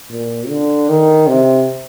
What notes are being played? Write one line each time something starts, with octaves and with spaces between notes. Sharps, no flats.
A#2
D3
D#3
C3